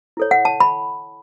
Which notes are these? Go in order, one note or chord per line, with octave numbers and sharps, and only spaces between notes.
E4 A4 C#5
F#5
A5
B5